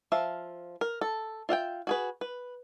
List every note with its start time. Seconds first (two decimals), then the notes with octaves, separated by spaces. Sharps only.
0.12 F3 E5 F5
0.81 A#4
1.01 A4
1.49 F4 E5 F#5 G5
1.87 F#4 G#4 B4
2.21 B4